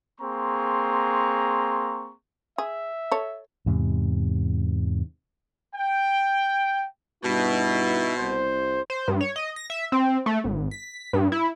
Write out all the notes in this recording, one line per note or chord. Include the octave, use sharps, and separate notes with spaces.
A#3 C4 G#4 A#5 C6 C#6
G#4 E5
A4 C#5
E2 G#2 C3
G5
G2 B2 D#4 E4
C2 C5
C5
G2
C#5
D#5
A#6
E5
C4
A3
G#1
B6
G2
E4